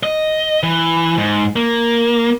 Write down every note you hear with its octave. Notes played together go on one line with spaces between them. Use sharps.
D#5
E3
G#2
A#3